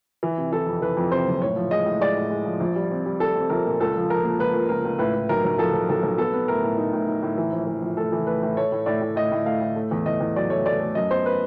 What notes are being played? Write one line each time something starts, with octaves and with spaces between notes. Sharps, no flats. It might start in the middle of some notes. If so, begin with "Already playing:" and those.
E3
C3
E3 A4
F2
E3 B4
F2
C3 C5
F#1
A2 C#5
F3
G#3 D#5
A2
G#3 D5
A2
G#3
F3
A#1
G3
C4
G3
G3 A4
C4
A#1 A#4
A#2
C#2 A4
F3
F3 A#4
A#3
C#2 B4
A#3
C#2 A#4
C#2
A2 B4
A2
B1 A#4
B1
F3 A4
B1
B1 A4
B1
B3 A4
B3
A2 A#4
A2
D#4
A2
D#4
A2
E3
A#1
E3
A#1
A3 A4
E3
A3 B4
A2
A3 C#5
A2
A2 D5
A2
A2 D#5
A2
A3 F5
A2
A3
E2
E2 D#5
E2
F#3 D5
A3 C#5
A3 D5
A3
F#2 D#5
B3 C5
B4